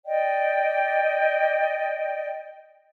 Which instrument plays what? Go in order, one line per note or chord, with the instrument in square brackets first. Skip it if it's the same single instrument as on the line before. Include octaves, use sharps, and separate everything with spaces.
[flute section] D5 D#5 G5